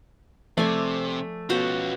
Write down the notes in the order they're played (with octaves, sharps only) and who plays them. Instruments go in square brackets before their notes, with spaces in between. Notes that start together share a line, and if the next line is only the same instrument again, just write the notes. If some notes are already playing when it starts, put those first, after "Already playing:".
[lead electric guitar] C3 [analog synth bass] F3 [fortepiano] A3 [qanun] D5 G#5
[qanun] B2 F#4 C5 [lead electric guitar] C#4 F4